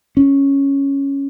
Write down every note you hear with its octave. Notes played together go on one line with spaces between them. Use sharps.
C#4